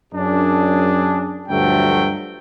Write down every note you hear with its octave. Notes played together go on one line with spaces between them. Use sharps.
F#2 D4 G#4
D2 G2 F3 F#3 A3 G5